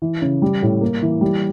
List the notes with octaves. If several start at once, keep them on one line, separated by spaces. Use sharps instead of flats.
E3
C#3
G3
A2
A#3
E3
G3